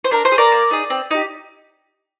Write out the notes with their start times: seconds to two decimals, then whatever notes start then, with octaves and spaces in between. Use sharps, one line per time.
0.04 C5
0.11 D4 A#4
0.25 C5
0.32 G#4
0.38 A#4 D5
0.52 A#3
0.71 D#4 G#4
0.90 C4
1.11 D#4 G4